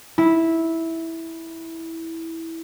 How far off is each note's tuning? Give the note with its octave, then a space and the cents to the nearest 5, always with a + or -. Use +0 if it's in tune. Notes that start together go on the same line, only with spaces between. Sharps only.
E4 -10